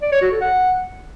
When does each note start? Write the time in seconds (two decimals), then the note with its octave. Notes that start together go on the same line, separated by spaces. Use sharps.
0.02 D5
0.12 C#5
0.22 F#4
0.31 A4
0.41 F#5